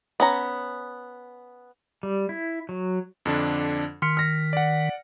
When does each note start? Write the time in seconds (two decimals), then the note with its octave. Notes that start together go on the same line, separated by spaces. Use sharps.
0.20 B3 C#4 A#5
2.03 G3
2.29 E4
2.69 F#3
3.25 F2 D3 D4
4.02 D#3 C6 F6 B6 C#7
4.17 F6 A#6
4.53 D5 F#5